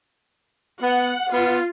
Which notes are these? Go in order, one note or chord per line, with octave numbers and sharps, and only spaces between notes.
B3 F#5
B3 F4